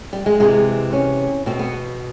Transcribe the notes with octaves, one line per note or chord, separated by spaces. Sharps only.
G3
G#3
C3 E3 G#3
C#4
B2 C4
B3